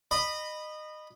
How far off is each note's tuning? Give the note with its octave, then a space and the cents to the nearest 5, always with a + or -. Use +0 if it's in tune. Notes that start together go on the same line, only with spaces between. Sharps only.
D#5 -20 B5 +0